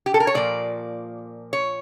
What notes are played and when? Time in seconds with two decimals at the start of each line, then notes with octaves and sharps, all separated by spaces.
0.06 G4
0.14 A4
0.20 A#4
0.27 C#5
0.35 A#2 F3 A#3 D5
1.53 C#5